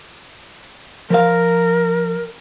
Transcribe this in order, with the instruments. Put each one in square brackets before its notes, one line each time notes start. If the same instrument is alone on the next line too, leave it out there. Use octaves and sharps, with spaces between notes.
[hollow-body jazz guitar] F3 F5 [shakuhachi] A#4